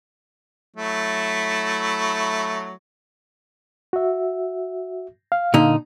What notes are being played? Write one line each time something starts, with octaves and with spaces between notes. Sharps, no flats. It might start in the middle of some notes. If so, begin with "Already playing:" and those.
F#3 A3 E4
F#4 E5
F5
A#2 D3 D#4